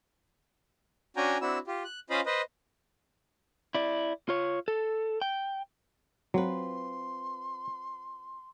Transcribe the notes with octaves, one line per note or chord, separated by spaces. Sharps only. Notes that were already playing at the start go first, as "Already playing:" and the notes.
C#4 D4 F#4 G5 G#5 A#5
C4 D4 E4 F#4 E6
F4 G4
F#6
C#4 F4 C5 D#5 F5 B5
B4 C5 D#5
E4 D5
F4 C#5
A4
G5
F#3 C4 F4 B4 C6